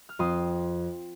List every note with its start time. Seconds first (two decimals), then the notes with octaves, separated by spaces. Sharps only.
0.09 F6
0.19 F2 C6 D#6